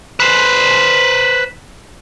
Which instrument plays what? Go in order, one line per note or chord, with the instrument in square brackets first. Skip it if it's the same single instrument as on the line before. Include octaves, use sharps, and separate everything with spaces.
[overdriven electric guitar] B4 C5